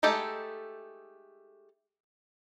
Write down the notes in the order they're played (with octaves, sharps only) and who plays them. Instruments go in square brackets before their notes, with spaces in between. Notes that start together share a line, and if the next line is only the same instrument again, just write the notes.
[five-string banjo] G#3 A3 D#4 G4 A4